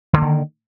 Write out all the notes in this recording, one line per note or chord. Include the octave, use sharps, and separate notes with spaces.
D3 D#3 A#3